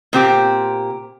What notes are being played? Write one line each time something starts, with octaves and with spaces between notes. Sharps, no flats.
A#2 C4 G4